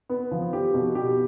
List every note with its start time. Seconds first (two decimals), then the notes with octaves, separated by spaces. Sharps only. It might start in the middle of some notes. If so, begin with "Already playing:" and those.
0.09 B3
0.31 F3
0.53 G4
0.74 B2
0.95 G4